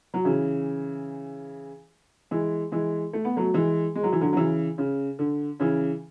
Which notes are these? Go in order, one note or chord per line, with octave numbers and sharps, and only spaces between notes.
F#3
C#3 E3
E3 G#3
E3 G#3
A3
B3
F#3 A3
E3 G#3
G#3
F#3
E3
D3 F#3
F#3
C#3 E3
C#3
D3
C#3 E3